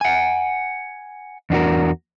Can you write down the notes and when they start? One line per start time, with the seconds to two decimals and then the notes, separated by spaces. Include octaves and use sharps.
0.01 F#5 G#5
1.50 E2 D4 F#4 A#4